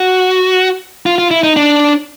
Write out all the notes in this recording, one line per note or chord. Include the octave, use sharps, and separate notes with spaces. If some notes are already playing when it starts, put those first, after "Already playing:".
Already playing: F#4
F4
F4
E4
D#4
D4